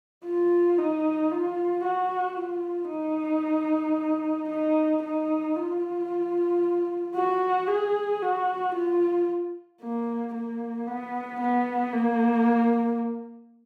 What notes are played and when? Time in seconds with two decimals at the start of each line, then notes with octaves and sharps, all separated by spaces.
0.25 F4
0.78 D#4
1.31 F4
1.84 F#4
2.37 F4
2.90 D#4
4.49 D#4
5.03 D#4
5.56 F4
7.15 F#4
7.68 G#4
8.22 F#4
8.75 F4
9.82 A#3
10.34 A#3
10.87 B3
11.41 B3
11.93 A#3